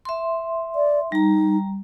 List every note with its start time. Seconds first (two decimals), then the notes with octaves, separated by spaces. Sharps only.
0.05 E5 C6
0.75 D5
1.12 G3 D#4 A#5